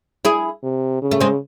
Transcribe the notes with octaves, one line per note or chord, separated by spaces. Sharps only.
E4 G#4
C3
C#3
A3
G#3 C4